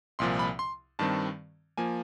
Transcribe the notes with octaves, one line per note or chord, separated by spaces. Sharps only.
C2 A#2 F3 C6
B5
C6
G2 D#3 G3 C4 A5
F3 A#3 G#5